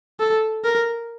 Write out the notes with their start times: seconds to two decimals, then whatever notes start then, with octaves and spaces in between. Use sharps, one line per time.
0.20 A4
0.64 A#4